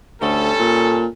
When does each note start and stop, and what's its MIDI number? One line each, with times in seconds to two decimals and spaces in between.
0.22 0.51 38
0.22 1.07 55
0.22 1.07 61
0.22 1.07 69
0.59 1.06 46